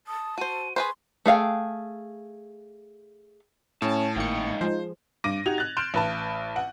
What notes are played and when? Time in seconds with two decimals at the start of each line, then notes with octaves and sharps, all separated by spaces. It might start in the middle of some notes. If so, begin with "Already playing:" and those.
0.07 A5 D#6
0.38 F#4 C5 D#7
0.76 G#4 B4 C5 C6 C#6
1.26 A3 G#4 F5 G5
3.82 A2 C#4 A5
4.16 G#1 G#2 A#3 D#4 F5 G5 C#7
4.61 F3 G#3 C5
5.24 G2 D6 A#6 D#7
5.46 D#4 F#4 G4 G#6 F7
5.58 F#6 A6
5.77 C6 F6 G6 D7 E7
5.94 A1 B4 A5
6.56 F#5